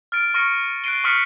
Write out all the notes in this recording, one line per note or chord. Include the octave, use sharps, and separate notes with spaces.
F6 A6 D7
C#6 F6 A#6 C#7 D#7
F#6 A6 C7 D7 D#7 G7
C#6 D#6 F6 B6 C#7